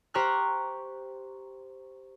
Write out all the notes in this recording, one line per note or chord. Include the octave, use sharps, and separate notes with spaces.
G4 C5 A#5 C#6 F6 F#6